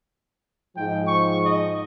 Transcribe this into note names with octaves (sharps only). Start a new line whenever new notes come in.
G#2 F3 G5
C#6
D#5